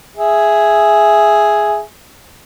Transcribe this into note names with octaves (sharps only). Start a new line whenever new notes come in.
G#4 E5